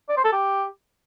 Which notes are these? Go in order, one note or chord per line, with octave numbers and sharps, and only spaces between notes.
D5
C5
A4
G4